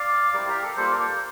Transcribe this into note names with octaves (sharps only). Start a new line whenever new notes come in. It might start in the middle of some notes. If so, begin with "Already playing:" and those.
Already playing: D5 F5
G3 C4 E4 A#4 D5
G4 A#4
A4
G3 A#3 F4 A4 C5
A#4 D5